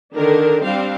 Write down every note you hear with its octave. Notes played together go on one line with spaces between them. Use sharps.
D3 D#3 D4 A#4
G3 C4 D4 F5